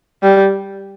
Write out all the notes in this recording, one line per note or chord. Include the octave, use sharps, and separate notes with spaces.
G3